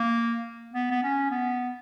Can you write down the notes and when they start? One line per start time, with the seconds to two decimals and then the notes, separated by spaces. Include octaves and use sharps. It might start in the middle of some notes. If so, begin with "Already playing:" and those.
Already playing: A#3
0.74 B3
0.91 B3
1.03 C#4
1.31 B3